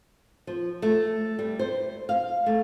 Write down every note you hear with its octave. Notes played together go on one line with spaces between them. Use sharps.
F3
A3
G3
C5
F5
A3